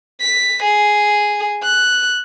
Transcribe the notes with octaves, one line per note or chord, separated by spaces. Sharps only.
B6
G#4
F#6